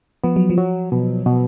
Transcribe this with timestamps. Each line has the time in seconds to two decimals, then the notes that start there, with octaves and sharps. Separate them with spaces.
0.24 F3 B3
0.36 F#3
0.50 F3
0.58 F#3
0.92 B2
1.26 B2